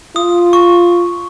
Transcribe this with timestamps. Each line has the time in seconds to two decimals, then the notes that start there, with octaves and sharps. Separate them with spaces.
0.16 F4 D#6
0.53 C#6